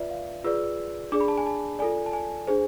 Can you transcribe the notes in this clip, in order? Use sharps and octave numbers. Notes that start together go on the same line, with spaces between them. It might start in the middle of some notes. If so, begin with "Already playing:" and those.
Already playing: F4 B4 D5 E5
F5
F4 G#4 B4 D5 E6
D4 G#4 D5 D6
B5
A5
G#5
A5
F4 A4 D5 G#5
A5
G#5
D4 G#4 C5